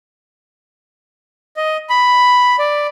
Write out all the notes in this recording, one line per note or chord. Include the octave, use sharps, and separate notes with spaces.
D#5
B5
D5